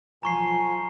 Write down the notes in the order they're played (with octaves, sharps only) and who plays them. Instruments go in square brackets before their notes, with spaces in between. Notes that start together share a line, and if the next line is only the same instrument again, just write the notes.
[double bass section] B1 F3 [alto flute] G#5 [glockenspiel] A#5 C#6 C7